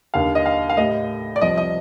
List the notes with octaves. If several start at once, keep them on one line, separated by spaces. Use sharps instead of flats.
D#2 D3 G3 F5
D#5
F5
F5
A2 G3 D#5
D5
C2 C3 F3 D#5
D#5